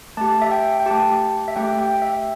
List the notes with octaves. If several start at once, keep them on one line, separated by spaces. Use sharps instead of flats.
A3 G4 A5
E5
G5
G5
A3 G4 A5
E5
A3 G4 G5
G5
E5